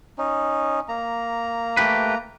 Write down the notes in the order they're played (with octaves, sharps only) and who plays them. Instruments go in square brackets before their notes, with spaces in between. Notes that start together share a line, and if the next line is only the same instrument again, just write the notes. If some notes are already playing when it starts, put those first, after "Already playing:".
[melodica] C#4 D#4
A#3 A#5
[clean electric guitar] A3 G4 B4